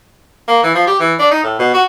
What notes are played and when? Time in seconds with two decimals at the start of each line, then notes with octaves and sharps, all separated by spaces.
0.48 A#3
0.63 E3
0.75 F3
0.87 G4
1.00 E3
1.19 D4
1.31 D#4
1.43 A2
1.59 B2
1.74 F#4